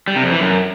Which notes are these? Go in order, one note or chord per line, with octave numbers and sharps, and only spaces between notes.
G3
C3
F2
E3
F#2